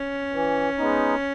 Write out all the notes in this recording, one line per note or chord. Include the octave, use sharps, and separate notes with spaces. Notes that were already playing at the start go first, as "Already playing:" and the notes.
Already playing: C#4
E3
G#3 B3 D#4